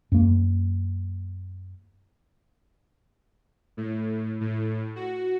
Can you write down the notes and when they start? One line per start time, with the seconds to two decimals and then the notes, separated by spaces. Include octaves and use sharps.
0.12 F#2 A#3
3.77 A2
4.41 A2
4.96 F#4